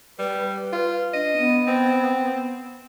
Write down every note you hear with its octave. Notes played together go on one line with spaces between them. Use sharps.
G3 B4
F4
D4 D#5
B3
C4